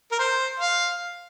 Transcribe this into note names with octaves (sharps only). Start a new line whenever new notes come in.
A#4
C5
F5